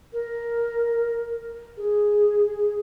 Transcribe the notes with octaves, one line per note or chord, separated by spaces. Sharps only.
A#4
G#4